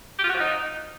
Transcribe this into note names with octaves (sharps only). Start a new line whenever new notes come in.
G4
F4
F#4
F3
D#4